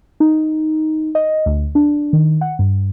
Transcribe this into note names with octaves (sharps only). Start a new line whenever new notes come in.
D#4
D#5
D2
D4
D#3
F#5
G2